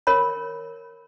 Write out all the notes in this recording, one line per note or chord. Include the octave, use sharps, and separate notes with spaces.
A#4 C#5 B5